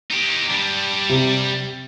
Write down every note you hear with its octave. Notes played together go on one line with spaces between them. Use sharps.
D#4 G4
G3 D4
C3